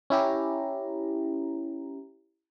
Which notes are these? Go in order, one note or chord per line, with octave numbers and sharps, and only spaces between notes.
C#4 E4 G4 A#5